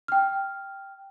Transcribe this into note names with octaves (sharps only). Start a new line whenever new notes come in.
G5 F6